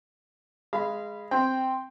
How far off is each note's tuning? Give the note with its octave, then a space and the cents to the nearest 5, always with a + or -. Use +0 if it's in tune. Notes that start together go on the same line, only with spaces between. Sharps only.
G#3 +0 F5 -25 B5 +0
C4 +0 G5 +0